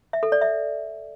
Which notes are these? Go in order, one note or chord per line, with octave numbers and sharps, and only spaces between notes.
E5
A4
D5
E5